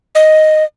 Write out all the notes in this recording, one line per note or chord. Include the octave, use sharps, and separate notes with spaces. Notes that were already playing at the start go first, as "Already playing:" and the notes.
D#5